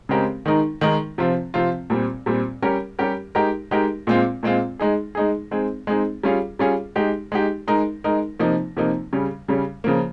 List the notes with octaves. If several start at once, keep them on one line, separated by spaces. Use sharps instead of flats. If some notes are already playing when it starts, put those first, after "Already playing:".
C#3 G#3 C4 G4 A#4
D#3 G#3 D#4 A#4
D#3 G#3 D#4 A#4
C3 F3 C4 F4
C3 F3 C4 F4
A#2 G3 C4
A#2 G3 C4
G3 C#4 G4 A#4
G3 C#4 G4 A#4
G#3 D#4 G4 A#4
G#3 D#4 G4 A#4
A#2 G#3 C4 F4
A#2 G#3 C4 F4
G#3 D#4 G#4
G#3 D#4 G#4
G#3 C4 D#4 G#4
G#3 C4 D#4 G#4
G3 C#4 F4 G#4
G3 C#4 F4 G#4
G#3 D#4 G4
G#3 D#4 G4
G#3 D#4 A#4
G#3 D#4 A#4
C3 F3 A#3 D#4
C3 F3 A#3 D#4
C#3 G3 C#4
C#3 G3 C#4
C#3 F3 A#3